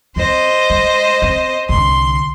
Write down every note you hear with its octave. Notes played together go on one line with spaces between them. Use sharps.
C4 F4 C5 D#5
G#3
C4
C2 D3 C6